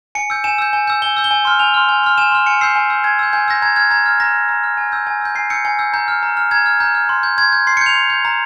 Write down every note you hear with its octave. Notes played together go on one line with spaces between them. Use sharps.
G#5 C#7
E6 G6
G#5 E7
E6 G6
G#5
E6 G6
G#5 G7
E6 G6
G7
G#5
C6 F6
G#5 F7
C6 F6
G#5
C6 F6
G#5 E7
C6 F6
G#5 C#7
E6 G6 C7
G#5
E6 G6
G#5 G#6
E6 G6
G#5 G6
E6 G6 A#6
A#5 G#6
F6 G#6
A#5 G#6
F6
A#5 A#6
F6
A#5
F6
G#5
E6 G6
G#5
E6 G6
G#5 C7
E6 G6 C#7
G#5
E6 G6
A#5 G6
F6
A#5
F6
A#5 G#6
F6
A#5 G6
F6
C6
G6
C6 G#6
G6
C6 C7
C#7
G6
F7
C6
G6
A#5